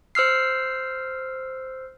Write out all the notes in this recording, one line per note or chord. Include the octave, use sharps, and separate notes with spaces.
C5 E6 F6 C7